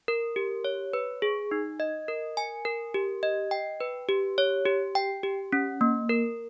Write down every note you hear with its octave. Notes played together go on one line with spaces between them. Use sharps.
A#4
G4
C#5
B4
G#4
D#4
D#5
A#4
G#5
A#4
G4
D#5
G5
B4
G4
C#5
G4
G5
G4
C#4
A#3
A#4